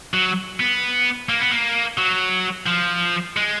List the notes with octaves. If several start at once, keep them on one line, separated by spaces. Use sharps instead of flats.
F#3
B3
A#3
B3
A#3
F#3
F3
G#3